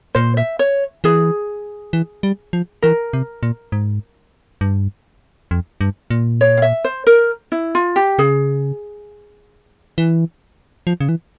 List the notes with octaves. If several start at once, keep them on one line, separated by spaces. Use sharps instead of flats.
A#2 C5
E5
C#5
E3 G#4
E3
G3
F3
E3 A#4
C3
A#2
G#2
G2
F2
G2
A#2
C#5
F5
E5
C5
A#4
E4
F4
G4
C#3 G#4
E3
F3
C#3
E3